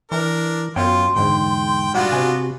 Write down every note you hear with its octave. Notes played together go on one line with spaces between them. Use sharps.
E3 D4 A#4
F#2 B3 F4 C#5 G5 C6
E2 G#2 D3 G5
B1 G3 B3 D4 F4 F#4 F#5
C3 G#5